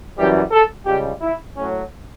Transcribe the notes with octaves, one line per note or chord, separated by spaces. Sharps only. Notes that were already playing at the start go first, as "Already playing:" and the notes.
F#2 E3 G3 G4
A4
C#2 C#3 G3 G4
E4
A2 F#3 C#4